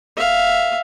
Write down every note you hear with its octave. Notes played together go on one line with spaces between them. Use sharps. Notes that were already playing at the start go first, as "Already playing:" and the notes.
E5 F5